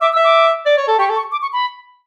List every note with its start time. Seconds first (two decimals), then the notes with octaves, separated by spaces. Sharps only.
0.01 E5 D6
0.12 E6
0.16 E5
0.24 D6
0.66 D5
0.77 C#5
0.88 A4
0.99 G4 C#6
1.10 A4
1.15 C#6
1.32 D6
1.42 C#6
1.53 B5